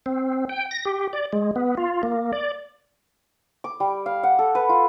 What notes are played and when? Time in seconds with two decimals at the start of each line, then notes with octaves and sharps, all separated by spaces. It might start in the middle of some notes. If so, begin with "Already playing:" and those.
0.06 C4
0.49 G5
0.71 A#6
0.85 G4
1.13 D5
1.33 G#3
1.56 B3
1.77 F4
2.03 A#3
2.33 D5
3.64 D6
3.80 G3
4.06 F5
4.23 F#5
4.39 A4
4.55 B4
4.69 F4